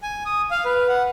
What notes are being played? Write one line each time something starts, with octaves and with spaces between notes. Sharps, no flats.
G#5
D#6
F5
B4
F#5